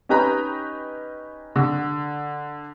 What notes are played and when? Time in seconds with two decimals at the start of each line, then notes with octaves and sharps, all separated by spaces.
0.09 C#4 D#4 G4 B4 A#5 B5
1.56 D3